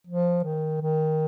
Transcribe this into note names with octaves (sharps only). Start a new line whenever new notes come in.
F3
D#3
D#3